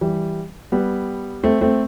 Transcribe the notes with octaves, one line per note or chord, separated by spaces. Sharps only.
E3 G3
G3 B3
A3 C4
A3 C4